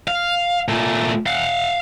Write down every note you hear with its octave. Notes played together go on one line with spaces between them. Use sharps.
F5
A#2 A3
F5 F#5